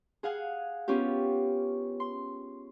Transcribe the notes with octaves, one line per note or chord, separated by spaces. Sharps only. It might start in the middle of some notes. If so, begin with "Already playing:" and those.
G#4 F5 F#5 G#5
B3 C#4 F4 G4
C6